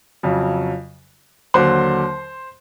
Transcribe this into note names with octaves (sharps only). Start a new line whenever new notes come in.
F2 C#3 F#3
D#2 D3 F#3 C5 C6